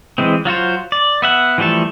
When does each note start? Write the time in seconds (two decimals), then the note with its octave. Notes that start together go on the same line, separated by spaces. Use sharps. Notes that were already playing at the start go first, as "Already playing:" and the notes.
0.18 E3 G#3 C4
0.45 F#3 F4 F#4 C5
0.92 D5
1.22 B3 E5 F#5
1.58 E3 F3 G3 A3 A4